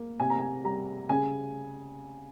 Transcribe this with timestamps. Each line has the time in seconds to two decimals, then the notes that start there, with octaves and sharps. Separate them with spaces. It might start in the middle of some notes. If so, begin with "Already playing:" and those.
Already playing: A#3
0.20 C3 G#5
0.30 A#5
0.39 G#5
0.64 G3 A#5
1.09 C#3 G#5